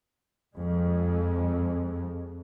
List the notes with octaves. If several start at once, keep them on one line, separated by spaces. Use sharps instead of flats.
F2 G#3